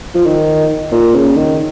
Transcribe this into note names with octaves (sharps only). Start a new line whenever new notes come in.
F3
D#3
A#2
C#3
D#3